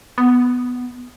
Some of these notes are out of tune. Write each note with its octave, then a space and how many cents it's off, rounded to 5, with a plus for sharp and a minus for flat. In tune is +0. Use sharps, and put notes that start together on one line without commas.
B3 +5